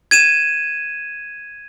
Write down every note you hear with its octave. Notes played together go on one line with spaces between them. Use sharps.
G#6 D#7 E7